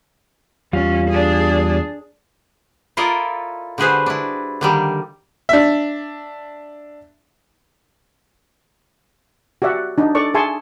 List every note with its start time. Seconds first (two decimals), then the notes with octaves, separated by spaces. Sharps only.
0.73 E2 G3 C#4 F4
1.10 D4 G#4
2.97 E4 F4 A4 A#4 D5 D#5
3.78 D3 G3 F#4 G#4 B4 C5
4.06 D4 E4
4.61 D3 D#3 G3 A#3
5.49 D4 E5
9.62 F#4 G4 D5 E5 F#5
9.98 D4 D#4
10.15 A4 D5 C#6
10.34 G#4 E5 G#5 A5 C6 C#6